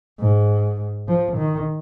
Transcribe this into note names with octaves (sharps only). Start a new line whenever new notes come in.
G#2
F3
D#3